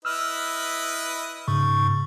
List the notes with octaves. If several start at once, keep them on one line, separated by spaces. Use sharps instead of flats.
E4 B4 D#5 E6 F6
G#2 C#3 C#6